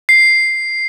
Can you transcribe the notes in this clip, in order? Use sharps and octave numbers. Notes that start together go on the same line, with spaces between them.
C7